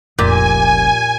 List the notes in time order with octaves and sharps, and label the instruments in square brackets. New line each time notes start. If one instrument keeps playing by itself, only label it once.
[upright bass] F1 C2 [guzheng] A#2 G4 [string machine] G#5